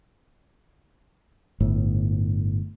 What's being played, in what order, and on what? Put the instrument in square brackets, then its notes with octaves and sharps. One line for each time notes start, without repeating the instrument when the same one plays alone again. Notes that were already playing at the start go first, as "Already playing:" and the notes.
[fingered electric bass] G1 A2